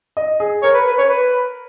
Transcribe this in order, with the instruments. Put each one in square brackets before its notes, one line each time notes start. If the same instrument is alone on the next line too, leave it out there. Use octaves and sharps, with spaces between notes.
[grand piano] D#5
G#4
[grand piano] A#4 [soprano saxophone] C#5
[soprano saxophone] B4
B4
C#5
B4